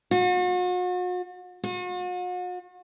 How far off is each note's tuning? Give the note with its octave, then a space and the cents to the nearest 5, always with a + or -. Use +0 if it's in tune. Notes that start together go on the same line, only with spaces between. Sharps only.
F#4 -40
F#4 -45